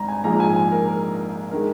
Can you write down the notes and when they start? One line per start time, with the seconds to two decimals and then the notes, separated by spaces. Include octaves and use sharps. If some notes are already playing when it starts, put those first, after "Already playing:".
Already playing: G#1 G#2 G3 A#5
0.08 G#5
0.24 A#1 G#2 F3 G#3 A#5
0.40 G#5
0.56 G#5
0.72 A#4
0.87 A#4
1.51 D#3 G#3 A#4